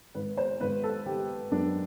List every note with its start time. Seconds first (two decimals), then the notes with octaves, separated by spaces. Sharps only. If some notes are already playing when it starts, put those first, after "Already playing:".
0.15 G#1 B4
0.37 C5
0.60 G#1 B4
0.83 A4
1.06 D#3 G4
1.51 F#2 D4